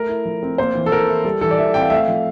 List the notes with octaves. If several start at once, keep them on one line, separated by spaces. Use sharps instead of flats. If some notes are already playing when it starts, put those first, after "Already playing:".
Already playing: A3 A#4
E4
F3
C4
A#3 C5
E3
A4
E3 A#4
E4
G3 A4
E3 A4
D5
E3 E5
C4 G5
F5
A3 E5
F5
F3